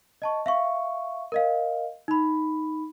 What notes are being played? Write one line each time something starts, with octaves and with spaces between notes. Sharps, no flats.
D#5 A5 C#6
E5 F5 C#6
A#4 D#5 F5
D#4 B5